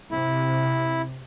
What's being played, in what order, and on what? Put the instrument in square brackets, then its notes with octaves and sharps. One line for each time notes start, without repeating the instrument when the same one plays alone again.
[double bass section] C3 [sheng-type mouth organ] E4